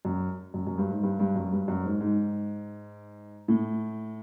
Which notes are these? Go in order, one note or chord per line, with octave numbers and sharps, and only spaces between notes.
F#2
F#2
F#2
G2
G#2
G2
G2
F#2
G2
F#2
G#2
G#2
A2